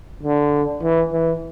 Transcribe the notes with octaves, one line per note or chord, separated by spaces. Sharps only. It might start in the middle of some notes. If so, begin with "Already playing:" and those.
D3
E3
E3